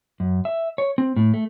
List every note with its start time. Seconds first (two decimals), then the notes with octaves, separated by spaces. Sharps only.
0.20 F#2
0.45 E5
0.78 C#5
0.98 C4
1.16 A2
1.34 A3